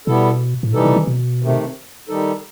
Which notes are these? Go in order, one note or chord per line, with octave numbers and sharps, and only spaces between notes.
B2 G3 B3 E4 A4
A2
B2 E3 G3 D#4 A4
C3
D#3
B2
C3 D#3 A3
D#3 G3 D#4 A4